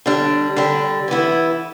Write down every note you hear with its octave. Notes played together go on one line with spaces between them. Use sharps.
D3 G3 D4
D3 G3 D4
E3 B3 E4